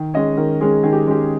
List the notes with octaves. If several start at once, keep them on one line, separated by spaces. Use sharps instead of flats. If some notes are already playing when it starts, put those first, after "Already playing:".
Already playing: D#3
G#3 C#4 D#5
D#3 A#4
G#3 C#4 G#4
D#3 G#4
G4
G#3 C#4 G4